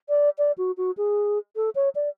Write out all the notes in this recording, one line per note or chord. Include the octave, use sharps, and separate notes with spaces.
D5
D5
F#4
F#4
G#4
A4
C#5
D5